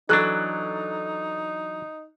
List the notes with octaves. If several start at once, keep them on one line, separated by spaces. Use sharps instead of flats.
E3 F#3 D4 D#4 A4 F#6